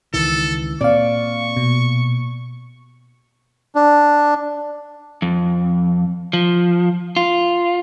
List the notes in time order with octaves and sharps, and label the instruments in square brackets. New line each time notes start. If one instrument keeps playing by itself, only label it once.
[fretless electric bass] C#2 D#3 E3 [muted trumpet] A4
[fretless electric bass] A#2 [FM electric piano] C4 F5 [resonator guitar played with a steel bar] D5 [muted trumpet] C#6
[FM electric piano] B2
[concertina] D4
[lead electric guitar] F2
F3
F4